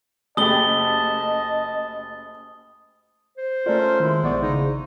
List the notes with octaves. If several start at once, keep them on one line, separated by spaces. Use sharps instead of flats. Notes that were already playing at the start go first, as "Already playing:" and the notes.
F#1 A3 G4 D#5 A5 D#6 G7
C5
A3 C#4 F4 A4 A#4 D5
C6
D#3 G#3 E4
A#1 B3 C5 D5 C#6
C#3 D#4